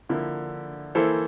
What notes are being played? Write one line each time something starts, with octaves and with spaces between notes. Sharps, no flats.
D3 F3 A#3 E4
E3 A#3 E4 A4 C5